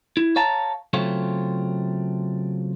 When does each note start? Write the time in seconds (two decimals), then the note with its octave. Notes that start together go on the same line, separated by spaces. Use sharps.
0.17 E4
0.36 C#5 F5 A5 A#5
0.93 C#3 F#3 A3 C4 F4 C#5